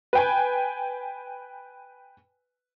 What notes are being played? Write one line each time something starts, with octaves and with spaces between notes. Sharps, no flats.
B4 G5 G#5